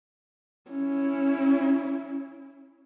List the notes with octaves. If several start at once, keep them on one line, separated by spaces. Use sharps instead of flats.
C#4 E4